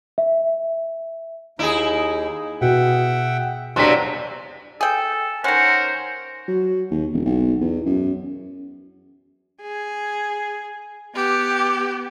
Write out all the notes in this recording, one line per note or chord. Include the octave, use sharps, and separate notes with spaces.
E5
D#2 D#4 E4 G#4
B2 E5 F#5 G5
E2 G2 C3 F#3 A5 C6 B6
G#4 A4 G5
D#3 C#4 A#4 C5 F#5
F#3
D#2
E1
B1
E2
F#2
G#4
B3 G4